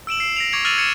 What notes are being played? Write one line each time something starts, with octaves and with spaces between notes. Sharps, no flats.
E6 D7 E7 F#7
C7
A#6 D7 F7
C#6 D6 G#6 C#7 F7
E6 F6 A6 D#7 F7 F#7
G#6 C#7 D#7 E7